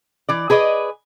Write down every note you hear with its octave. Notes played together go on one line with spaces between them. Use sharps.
E3 D5
G#4 B4 D5 D#5